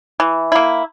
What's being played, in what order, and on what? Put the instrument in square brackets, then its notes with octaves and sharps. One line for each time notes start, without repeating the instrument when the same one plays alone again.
[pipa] E3
A#3 E4